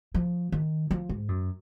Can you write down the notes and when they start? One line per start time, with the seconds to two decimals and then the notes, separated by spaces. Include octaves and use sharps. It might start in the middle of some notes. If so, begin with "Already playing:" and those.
0.14 F3
0.52 D#3
0.91 F3
1.09 G#2
1.29 F#2